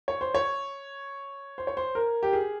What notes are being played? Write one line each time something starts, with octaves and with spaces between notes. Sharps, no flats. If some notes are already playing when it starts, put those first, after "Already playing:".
C#5
C5
C#5
C5
C#5
C5
A#4
G4
G#4